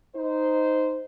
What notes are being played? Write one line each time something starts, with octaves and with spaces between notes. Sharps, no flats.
D#4 C5